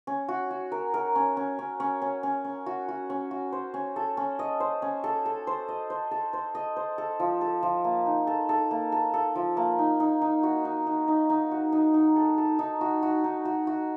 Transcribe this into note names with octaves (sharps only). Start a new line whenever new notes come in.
C#4
F#4
F#4
A#4
A#4
C#4
C#4
C#4
C#4
C#4
C#4
C#4
F#4
F#4
C#4
F#4
C5
C#4
A4
C#4
D#5
C5
C#4
A4
A4
C5
D#5
C5
A4
C5
D#5
C5
A4
F3
A4
F3
A#3
D#4
A4
A4
A#3
A4
A4
F3
A#3
D#4
D#4
D#4
F#4
D#4
D#4
D#4
D#4
F#4
D#4
D#4
A4
A4
D#4
F#4
F#4
D#4
F#4
F#4